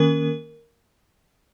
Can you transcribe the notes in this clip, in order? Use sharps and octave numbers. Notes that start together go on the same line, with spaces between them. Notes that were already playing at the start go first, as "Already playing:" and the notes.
Already playing: D#3 A#3 C#4 A#4